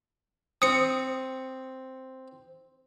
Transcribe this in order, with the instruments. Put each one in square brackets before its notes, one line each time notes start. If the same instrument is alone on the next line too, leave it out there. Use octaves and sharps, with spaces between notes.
[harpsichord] C4 [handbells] D#6 C#7